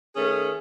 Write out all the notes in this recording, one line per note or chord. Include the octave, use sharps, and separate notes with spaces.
D#3 A3 C#4 G#4